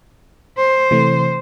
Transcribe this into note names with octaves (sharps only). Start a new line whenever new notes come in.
C5
C3 E3 A3